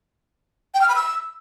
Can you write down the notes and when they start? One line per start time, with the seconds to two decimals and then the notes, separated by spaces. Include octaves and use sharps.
0.74 G5
0.82 F6
0.89 B5
0.96 E6